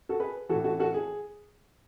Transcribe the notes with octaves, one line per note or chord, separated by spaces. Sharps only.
F#4 A4
G#4 B4
A2 E3 F#4 A4
F#4 A4
F#4 A4
G#4